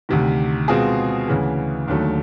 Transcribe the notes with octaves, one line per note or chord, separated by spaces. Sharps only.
D2 C3 D#3
B2 G#3 C4 F4 G#4
D2 C#3 E3
D#2 D3 F#3 A3